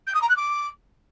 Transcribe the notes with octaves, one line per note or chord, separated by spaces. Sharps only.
G6
D#6
A#5
F#6
D6